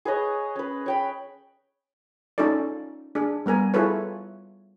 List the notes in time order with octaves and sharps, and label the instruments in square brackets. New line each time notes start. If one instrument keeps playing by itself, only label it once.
[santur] G#4 B4 C#5 D#5
C#4 B4
C#5 G5 B5
[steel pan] C#4 D#4 F4 A4 D5
D4 G#4
G3 B3 A#4 G#5
E4 F4 G#4 A4 B4 C#5